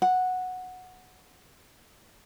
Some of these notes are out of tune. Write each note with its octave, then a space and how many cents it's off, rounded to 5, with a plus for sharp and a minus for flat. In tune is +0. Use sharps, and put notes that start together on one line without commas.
F#5 -10